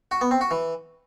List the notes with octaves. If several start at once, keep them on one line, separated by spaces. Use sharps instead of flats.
F#4
B3
C4
F#4
E3